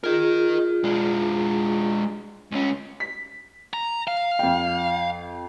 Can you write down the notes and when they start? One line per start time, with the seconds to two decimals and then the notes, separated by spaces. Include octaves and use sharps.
0.04 F4 G#4 A#4 D#5
0.84 G#3 D4
2.52 C#2 C#4
3.00 B6
3.73 A#5
4.08 F5
4.39 F2 G5